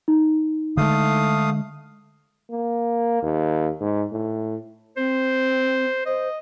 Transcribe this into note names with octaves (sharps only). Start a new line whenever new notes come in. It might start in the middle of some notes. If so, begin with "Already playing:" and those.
D#4
D3 G#3 A3 F5 D#6
A#3
D#2
G#2
A2
C4 C5
C5 D#5